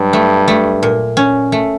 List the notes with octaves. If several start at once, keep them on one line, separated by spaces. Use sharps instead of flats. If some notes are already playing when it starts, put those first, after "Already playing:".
Already playing: G2 F#3
A3
A3
A#2
C#4
A3